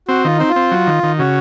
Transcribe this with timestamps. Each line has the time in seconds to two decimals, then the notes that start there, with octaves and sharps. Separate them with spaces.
0.08 C4 F#4
0.24 D#3 F4
0.37 C4 D#4
0.49 F4
0.56 C4
0.71 F#3
0.87 D#3
1.03 D#3
1.19 C#3 F#4